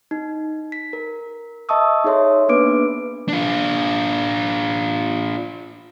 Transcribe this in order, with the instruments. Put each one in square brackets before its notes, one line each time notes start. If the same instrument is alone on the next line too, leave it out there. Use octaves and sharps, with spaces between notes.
[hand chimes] D#4
B6
A#4
D#5 E5 A5 C#6 D#6 E6
D#4 G#4 A4 C#5 E5 C6
A#3 B3 D4 B4 D6 D7
[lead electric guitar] D4 F4